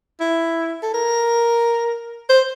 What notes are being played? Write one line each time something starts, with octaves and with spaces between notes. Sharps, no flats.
E4
A4
A#4
C5